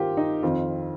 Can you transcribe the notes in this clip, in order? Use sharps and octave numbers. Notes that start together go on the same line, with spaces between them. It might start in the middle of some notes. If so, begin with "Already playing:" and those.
Already playing: G2 D#3 A#3 F4 G4 A#4 C5
D#4
F2 D#3 C4 F4